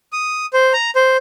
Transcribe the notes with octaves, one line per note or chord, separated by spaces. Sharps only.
D#6
C5
A#5
C5